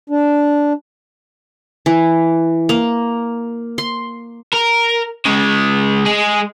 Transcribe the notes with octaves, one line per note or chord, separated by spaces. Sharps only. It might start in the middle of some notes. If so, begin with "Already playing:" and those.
D4
E3
A#3
C6
A#4
C#3 G#3
G#3 G#4